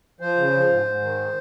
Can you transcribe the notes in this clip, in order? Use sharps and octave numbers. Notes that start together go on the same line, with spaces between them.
F3 C5
C#3
F3
G#2
G#2
D#3